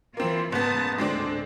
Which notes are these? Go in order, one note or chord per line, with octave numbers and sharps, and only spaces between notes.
E3 A#3 C4 F4
F#1 G#2 B3 A5 D#6
D2 A2 D3 G#3 C4 D4